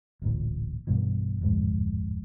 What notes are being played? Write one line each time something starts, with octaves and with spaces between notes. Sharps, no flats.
D1 A1 A#2
B1 G2 B2 E3
D1 F2 G#2